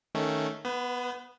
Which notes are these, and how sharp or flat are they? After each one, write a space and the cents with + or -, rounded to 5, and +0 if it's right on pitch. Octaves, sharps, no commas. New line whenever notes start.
D#3 +0 A3 +0 C#4 +0
B3 -5 B4 +40